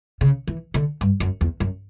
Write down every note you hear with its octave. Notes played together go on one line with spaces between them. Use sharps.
C#3
E3
D3
G2
F#2
E2
F#2